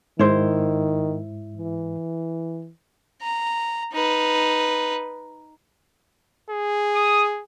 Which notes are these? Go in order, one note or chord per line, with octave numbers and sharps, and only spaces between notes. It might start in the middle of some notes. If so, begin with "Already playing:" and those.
G#2 D#3 E4 C5
E3
A#5
D#4 B4
G#4
D#6